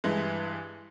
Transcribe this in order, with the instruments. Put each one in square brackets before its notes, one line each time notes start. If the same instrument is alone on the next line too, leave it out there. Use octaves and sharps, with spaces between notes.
[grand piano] G2 E3 G#3